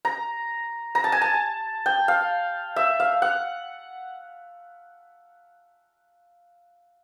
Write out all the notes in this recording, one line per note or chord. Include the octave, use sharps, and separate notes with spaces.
A#5
A#5
A5
G#5
A5
G5
F5
E5
F5
F#5